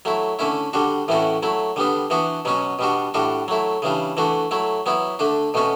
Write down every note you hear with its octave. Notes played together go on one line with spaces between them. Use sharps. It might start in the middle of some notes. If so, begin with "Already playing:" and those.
F#3 A3 E4
D3 A3 C#4 E4
D3 G3 D4 F#4
A2 E3 A3 C#4 F#4
F#3 A3 E4
D3 G3 B3 D4
E3 B3 D4 F#4
B2 F#3 C#4 F#4
B2 G3 D4 F#4
A2 G3 D4 F#4
F#3 A3 E4
C#3 E3 G3 D4
E3 A3 D4 F#4
F#3 A3 E4
F#3 B3 E4
D3 A3 D4
B2 A3 C#4 F#4